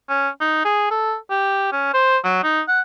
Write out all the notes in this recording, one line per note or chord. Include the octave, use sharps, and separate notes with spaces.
C#4
D#4
G#4
A4
G4
C#4
C5
F#3
D#4
F#5